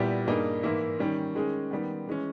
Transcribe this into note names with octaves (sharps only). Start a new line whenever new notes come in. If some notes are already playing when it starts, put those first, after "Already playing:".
Already playing: A#2 G3 B3 E4 G4
G2 G3 A#3 D#4 G#4
G#2 E3 A#3 E4
D#3 G3 C#4
D#3 G#3 C#4 G#4
D#3 G3 B3
E3 G#3 C#4